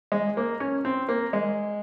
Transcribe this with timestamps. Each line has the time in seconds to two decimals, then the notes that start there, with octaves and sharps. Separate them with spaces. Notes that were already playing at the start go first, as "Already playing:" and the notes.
0.12 G#3
0.37 A#3
0.60 C#4
0.85 C4
1.09 A#3
1.33 G#3